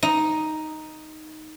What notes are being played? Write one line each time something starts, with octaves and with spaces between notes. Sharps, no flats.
D#4